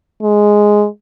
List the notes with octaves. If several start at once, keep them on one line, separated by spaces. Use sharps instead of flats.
G#3